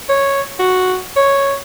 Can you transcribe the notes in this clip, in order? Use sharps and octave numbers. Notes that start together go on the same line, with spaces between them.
C#5
F#4
C#5